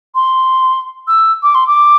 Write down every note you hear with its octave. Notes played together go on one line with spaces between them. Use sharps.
C6
E6
D6
C6
D6